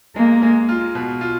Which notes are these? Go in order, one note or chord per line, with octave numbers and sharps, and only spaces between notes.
G#3 A#3
G#3
F4
B2
F4